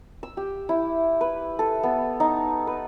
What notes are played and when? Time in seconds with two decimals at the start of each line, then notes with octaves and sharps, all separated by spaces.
0.23 E6
0.37 G4
0.69 E4
1.21 B4
1.59 A4
1.83 B3
2.20 D#4
2.67 B4